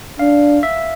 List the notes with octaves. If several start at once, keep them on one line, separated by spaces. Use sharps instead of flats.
D4 F5
E5